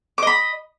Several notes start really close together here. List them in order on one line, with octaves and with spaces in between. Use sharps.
D6 D#5 B5